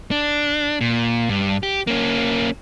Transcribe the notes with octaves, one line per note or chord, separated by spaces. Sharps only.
D4
A#2
G2
G4
A#3 C#4